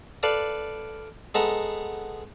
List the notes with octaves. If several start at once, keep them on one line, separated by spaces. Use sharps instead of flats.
A4 B4 D5 F5
G#3 B3 A4 E5 A#5